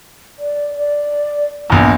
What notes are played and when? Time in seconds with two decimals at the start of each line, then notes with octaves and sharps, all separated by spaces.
0.39 D5
0.76 D5
1.70 A#1 E2 A#3